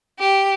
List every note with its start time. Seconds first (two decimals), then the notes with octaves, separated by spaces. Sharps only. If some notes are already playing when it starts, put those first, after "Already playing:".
0.19 G4